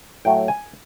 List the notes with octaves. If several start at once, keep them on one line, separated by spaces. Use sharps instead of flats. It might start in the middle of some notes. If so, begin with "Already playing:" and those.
A2 F#3 A3 G5
G#5